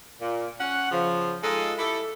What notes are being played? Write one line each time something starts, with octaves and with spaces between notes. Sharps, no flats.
A#2
C#4 F#5
C#3 F3
G#3 D#4 F4 A4 D#5
E4 G4 A4